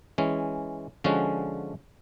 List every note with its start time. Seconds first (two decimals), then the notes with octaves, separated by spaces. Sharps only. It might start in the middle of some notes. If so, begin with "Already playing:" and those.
0.18 E3 G#3 C#4
1.04 D3 F3 G#3 C#4 F#4